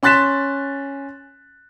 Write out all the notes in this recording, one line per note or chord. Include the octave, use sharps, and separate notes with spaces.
C#4 C6 F#6 A6 B6 E7